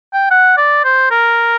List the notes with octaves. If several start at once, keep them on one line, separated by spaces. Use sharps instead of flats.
G5
F#5
D5
C5
A#4